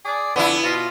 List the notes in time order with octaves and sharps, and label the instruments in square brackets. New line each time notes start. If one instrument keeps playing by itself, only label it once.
[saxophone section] G#4 D5
[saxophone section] F2 D3 [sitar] B3 E4
[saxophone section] B2 F4